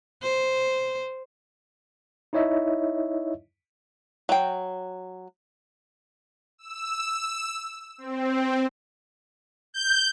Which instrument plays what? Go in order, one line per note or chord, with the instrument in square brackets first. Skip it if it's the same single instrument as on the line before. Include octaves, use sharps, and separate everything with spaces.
[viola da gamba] C5
[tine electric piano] D#4 E4 C#5 D#5 E5
[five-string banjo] F#3 G5
[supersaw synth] E6
C4
[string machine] G6